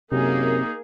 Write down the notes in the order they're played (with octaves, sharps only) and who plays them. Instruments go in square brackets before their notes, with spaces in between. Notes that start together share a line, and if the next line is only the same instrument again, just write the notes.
[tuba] F#2 [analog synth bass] C3 [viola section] A#3 G#4 [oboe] D#4